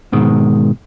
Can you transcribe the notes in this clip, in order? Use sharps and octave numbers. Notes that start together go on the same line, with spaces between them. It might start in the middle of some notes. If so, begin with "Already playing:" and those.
G#2 B2 D#3 G#3